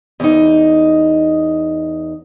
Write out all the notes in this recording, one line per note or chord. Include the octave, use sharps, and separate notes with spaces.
E2 D#4